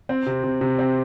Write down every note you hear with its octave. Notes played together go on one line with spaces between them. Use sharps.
C4
C3
C3
C3
C4